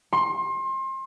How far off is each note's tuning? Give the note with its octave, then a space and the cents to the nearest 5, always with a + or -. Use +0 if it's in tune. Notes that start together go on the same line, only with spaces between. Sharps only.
C6 +30